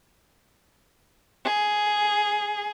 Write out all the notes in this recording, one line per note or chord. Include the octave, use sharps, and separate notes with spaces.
G#4